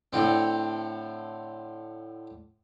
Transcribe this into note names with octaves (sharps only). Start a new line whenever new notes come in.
A2 D3 C4